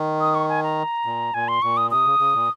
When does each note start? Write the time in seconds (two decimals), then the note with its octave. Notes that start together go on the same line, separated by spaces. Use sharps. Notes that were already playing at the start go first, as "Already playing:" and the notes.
Already playing: D#3
0.20 D#6
0.35 C#6
0.48 G#5
0.63 A#5
1.06 A#2
1.34 A#2 G#5
1.48 C6
1.62 A#2 C#6
1.77 D#6
1.91 C3 D#6
2.05 C#3
2.19 C#3
2.34 A#2